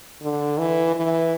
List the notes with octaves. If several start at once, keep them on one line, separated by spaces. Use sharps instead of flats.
D3
E3
E3